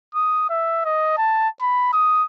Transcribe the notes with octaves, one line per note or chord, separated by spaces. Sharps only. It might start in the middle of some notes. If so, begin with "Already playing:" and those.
D#6
E5
D#5
A5
B5
D#6